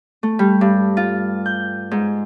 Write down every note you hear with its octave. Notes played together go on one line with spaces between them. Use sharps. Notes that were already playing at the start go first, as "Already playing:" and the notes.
A3
G3
G2
F4
G6
G#2